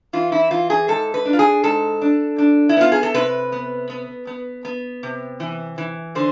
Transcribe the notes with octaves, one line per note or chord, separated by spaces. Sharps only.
E3 F4
E4
E3 F4
G#4
G#2 A4
B4
D4
F4
G#4
G#2 A4
D4
D4
E4
B3 F4
G#4
A4
C3 B4
B3
B3
B3
B3
C3
E3
E3
D3 C5